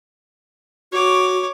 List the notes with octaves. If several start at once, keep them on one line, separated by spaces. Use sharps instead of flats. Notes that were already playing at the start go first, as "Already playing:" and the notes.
F#4 C#5 D6